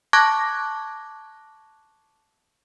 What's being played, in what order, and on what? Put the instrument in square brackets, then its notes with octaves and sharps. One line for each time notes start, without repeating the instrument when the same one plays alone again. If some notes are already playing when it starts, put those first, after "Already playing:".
[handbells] A5 C#6 D6 F#6 G#6 A#6